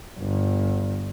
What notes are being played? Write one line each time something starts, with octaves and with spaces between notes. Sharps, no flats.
G1